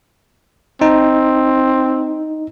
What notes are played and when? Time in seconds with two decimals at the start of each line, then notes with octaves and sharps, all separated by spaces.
0.81 C4 D#4